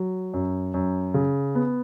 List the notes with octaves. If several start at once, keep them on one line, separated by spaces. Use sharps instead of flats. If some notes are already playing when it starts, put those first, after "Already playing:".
Already playing: F#3
F#2
F#2
C#3
B3